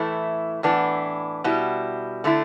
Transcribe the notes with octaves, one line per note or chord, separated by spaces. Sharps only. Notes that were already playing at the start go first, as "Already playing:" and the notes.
Already playing: A2 E3 A3 E4
A2 E3 B3 D4
B2 G3 E4
D3 A3 E4